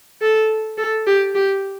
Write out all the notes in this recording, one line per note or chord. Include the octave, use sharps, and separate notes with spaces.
A4
A4
G4
G4